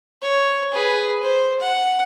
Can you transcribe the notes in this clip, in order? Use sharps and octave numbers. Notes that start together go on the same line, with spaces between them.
C#5
G#4 B4
C5
F#5